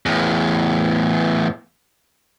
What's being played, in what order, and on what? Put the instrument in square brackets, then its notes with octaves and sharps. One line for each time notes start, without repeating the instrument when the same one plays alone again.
[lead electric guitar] E2 A2